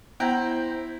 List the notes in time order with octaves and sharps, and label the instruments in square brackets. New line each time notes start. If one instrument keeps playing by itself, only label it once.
[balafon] B3 [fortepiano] E4 G5 A#5 [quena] C5